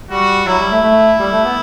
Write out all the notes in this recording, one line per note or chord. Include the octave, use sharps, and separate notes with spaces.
G3 F#4
F#3 E4
G3
A3
A3
G3
A3
B3